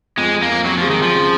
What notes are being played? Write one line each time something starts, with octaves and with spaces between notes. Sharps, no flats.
F2 G#3
F2
A#3
F2
F2 F#3
F3
G#3
D#3
F2 F3
C#3